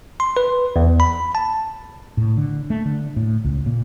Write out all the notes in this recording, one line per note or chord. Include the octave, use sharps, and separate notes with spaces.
C6
B4
E2
B5
A5
A2
D3
A3
D3
A2
C#2
A#2